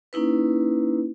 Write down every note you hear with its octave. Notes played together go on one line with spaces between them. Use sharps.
A#3 C#4 D#4 E4 B4